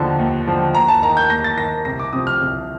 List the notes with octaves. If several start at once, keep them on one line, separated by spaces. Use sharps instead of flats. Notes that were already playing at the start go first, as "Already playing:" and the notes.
Already playing: D#2 D3 F3
D#2
D3 F3
D#2 A#5
A5
D#3 A#5
G6
D#2 A#6
A6
D#3 A#6
C2 A#6
D6
C3 F3 D#6
F6
C2